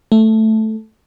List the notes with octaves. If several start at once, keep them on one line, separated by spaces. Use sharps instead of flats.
A3